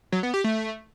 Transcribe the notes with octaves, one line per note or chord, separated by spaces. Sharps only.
F#3
B3
G4
A3